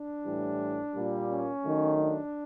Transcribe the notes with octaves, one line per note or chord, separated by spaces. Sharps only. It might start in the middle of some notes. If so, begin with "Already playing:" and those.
Already playing: D4
A2 E3 G3
A#2 G3 A#3
C#4
D#3 F#3 A3
D4